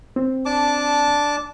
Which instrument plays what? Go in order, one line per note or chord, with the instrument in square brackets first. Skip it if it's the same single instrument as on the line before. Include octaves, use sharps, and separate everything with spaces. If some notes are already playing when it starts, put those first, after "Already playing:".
[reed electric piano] C4
[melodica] D4 A5 D6